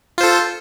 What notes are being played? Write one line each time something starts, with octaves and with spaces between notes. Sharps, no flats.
F4 A4 C5